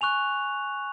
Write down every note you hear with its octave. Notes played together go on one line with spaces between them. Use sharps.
G#5 C#6 F#6 F7